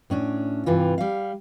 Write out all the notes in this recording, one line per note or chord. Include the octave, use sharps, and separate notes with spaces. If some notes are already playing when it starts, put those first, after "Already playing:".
A2 C#4 D4
G2 C3 E3 F4
G3 F5